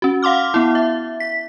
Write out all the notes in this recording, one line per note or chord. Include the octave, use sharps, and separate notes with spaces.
C#4 F#4
F5 F#5 C6 D6 F6
B3 E4
E5
B6